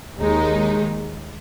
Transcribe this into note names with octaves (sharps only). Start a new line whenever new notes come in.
D#2 D#3 G#3 D#4